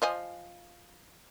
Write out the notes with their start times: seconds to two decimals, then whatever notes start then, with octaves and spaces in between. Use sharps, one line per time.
0.02 F3 D#5 G#5